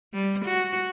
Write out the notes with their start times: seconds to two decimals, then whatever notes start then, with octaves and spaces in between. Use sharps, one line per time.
0.14 G3
0.45 F#4